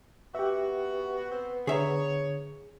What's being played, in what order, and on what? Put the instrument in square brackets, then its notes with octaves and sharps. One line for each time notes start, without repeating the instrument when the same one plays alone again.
[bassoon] B3 [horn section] F#4 [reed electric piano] G4 E5
[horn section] C4 C5
[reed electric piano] D3 [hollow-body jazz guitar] G#4 E5 A#5 [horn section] C#5